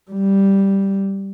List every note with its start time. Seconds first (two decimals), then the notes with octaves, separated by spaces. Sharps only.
0.11 G3